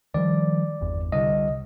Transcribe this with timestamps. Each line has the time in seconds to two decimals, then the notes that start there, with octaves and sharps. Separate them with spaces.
0.14 D#3 F3 G3 D5
0.81 G1 E2
1.12 C2 D3 D#5